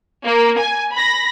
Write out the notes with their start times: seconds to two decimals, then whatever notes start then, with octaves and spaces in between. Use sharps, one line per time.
0.24 A#3
0.58 G#5
0.93 B5 A#6